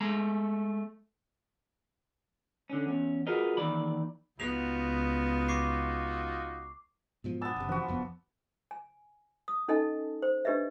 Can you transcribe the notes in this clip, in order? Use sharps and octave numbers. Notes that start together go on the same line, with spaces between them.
G#3 A3 A#5
D3 C#4
E2 C#4
F4 F#4 G#4 A#4 B4 D#5
D#2 D#3 E3 D5 B5
C#2 B3 D#4 F4 F#4 F7
C#6 D6 C7
G#2 B2 F3
B3 D4 G#5 E6 A6
F#1 C3
F3 F#4 B4
F#1 F2 B3
G#5
D#6
C#4 D#4 A4 D#5 G#5 A5
C5
D4 G4 B4 D#5 E5